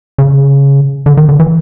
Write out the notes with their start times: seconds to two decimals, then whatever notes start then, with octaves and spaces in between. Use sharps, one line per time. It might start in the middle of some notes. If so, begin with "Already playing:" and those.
0.18 C#3
1.06 D3
1.17 D#3
1.29 D3
1.40 E3